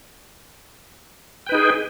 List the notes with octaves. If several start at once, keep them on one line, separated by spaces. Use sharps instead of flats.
D#4 G#4 B4 G5